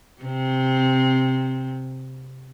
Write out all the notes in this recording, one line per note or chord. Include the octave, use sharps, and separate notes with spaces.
C3 C4